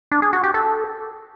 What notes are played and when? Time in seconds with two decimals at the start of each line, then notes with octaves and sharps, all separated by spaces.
0.12 D4
0.22 G#4
0.33 F#4
0.44 G4
0.54 A4